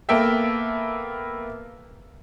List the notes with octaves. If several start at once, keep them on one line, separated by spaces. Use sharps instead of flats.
A#3 B3 A4 A#4 E5 G5